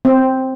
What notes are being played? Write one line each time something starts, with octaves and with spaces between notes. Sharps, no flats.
C4